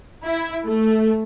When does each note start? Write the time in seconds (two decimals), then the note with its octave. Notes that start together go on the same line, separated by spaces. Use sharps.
0.23 E4
0.66 A3